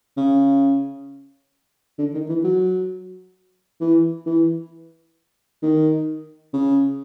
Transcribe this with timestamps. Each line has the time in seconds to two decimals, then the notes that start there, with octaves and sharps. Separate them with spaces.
0.17 C#3
1.99 D3
2.14 D#3
2.29 E3
2.44 F#3
3.81 E3
4.26 E3
5.63 D#3
6.53 C#3